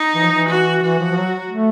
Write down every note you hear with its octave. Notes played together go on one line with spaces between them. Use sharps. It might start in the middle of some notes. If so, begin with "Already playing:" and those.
Already playing: D#4
E3
F3
E3
F#4
E3 F#4
F3
F3
F#3
A3